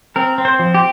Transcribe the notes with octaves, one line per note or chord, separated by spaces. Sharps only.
C4 A#4
C4
C5
F3
G4